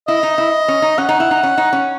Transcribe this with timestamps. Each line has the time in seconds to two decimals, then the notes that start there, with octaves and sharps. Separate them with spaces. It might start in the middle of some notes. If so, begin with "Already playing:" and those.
0.08 E4 D#5
0.23 D#4
0.38 E4
0.68 C#4
0.82 D#4
0.98 C#4 F#5
1.09 D#4
1.20 E4
1.31 D#4
1.43 C#4
1.58 D#4
1.73 C#4